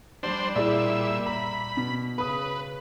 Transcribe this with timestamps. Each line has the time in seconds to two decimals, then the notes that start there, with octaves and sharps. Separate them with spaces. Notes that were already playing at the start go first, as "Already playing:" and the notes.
0.23 G3 D4 C5
0.55 A#2 E4 G#4 D5 E5
1.26 A#5 B5
1.77 B2
2.18 C#3 B4 B5 D#6